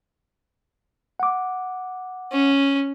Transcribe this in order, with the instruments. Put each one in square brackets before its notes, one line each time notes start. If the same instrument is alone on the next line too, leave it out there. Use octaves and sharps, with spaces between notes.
[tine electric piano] F#5 D6
[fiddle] C#4